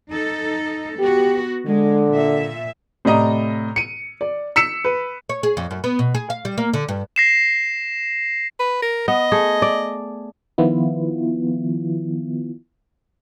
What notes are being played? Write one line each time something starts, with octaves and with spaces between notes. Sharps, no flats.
D#4 A4
B3 F#4 G4
D3 G#3
A#2 E5
A2 C3 D5 D#5 A#5
C#7 D#7
D5
E6 B6 C#7 E7
B4
C#5
G#4
F2
F#2
B3
B2
G#4
F5
G3
A#3
D3
G2
A#6 C7 E7
B4
A#4
B3 D#5
A3 G#4
D5
D#3 F3 B3 E4 F4